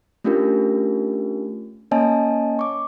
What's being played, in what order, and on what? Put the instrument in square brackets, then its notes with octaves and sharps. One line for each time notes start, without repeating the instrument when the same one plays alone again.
[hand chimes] A3 C#4 D4 F4 G4 A#4
A#3 C#4 C#5 D#5 G#5 A5
C#6 D6